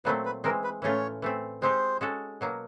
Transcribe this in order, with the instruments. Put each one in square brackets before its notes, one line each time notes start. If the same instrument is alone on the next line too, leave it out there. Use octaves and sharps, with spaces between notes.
[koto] A#2 F#3 A3 C4 [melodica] B4
[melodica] B4
[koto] E3 G#3 C4 [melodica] A#4
[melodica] B4
[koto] A2 E3 A3 C#4 F4 [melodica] C#5
[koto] E3 A3 C4
[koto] G#3 C4 D#4 G4 [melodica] C5
[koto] G#3 C#4 F#4 A4
B2 F#3 A#3